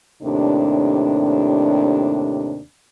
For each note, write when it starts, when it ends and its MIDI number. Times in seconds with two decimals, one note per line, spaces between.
0.23 2.59 39
0.23 2.59 45
0.23 2.59 48
0.23 2.59 62